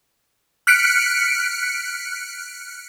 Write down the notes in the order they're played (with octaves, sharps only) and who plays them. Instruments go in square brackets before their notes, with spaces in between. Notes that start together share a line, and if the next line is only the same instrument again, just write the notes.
[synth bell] F6 F#6 B6 C#7 D7